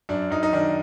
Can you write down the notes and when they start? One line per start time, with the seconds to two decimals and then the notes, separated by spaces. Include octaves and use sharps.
0.09 F#2 D4
0.30 F#2 D#4
0.43 D#4
0.53 D#3 D4